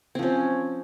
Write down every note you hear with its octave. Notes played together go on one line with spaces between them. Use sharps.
F3 C4 C#4